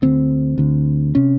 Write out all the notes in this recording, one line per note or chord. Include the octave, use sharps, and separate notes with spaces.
D2 D3 C4
D2 D3
C3 C#4